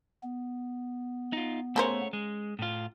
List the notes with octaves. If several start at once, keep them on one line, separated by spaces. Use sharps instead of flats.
B3
D#4 F4
C#3 A3 A#4 C5 C#5
G#3
A2 F4